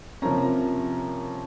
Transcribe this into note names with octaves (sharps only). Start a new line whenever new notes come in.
C3 F3 A#3 C#4 A#5